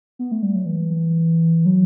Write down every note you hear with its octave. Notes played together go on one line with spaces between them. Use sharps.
B3
A3
G3
F#3
E3
F#3